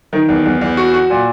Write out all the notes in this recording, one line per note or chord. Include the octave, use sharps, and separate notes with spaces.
D#3
E2
E2
E2
F#4
F#4
A#2